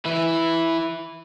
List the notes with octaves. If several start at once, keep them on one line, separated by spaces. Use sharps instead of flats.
E3 E4